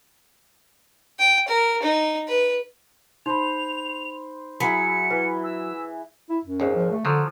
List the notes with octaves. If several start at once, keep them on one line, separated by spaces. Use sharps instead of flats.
G5
A#4
D#4
B4
D#4 C5 B5 F7
F#3 E4 G#4 B5 C#7
E3 B4
E6
E4
F#2
G#1 D#2
F3
A3
D3 F3 F#3